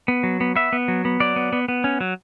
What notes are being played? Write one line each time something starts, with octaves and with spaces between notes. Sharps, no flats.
B3
F#3
B3
B3 E5
B3
F#3
B3
F#3 D5
B3
B3
B3
C#4
F#3